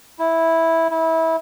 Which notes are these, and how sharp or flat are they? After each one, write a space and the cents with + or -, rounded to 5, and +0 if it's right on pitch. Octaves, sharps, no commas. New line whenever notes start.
E4 -10
E4 -25